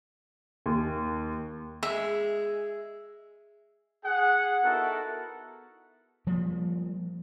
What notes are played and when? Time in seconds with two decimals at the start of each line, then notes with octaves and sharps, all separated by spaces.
0.66 D#2
1.83 G#3 E5
4.04 G#4 F#5
4.64 B3 D#4 E4 F#4 A4 A#4
6.27 F3 G3 A#3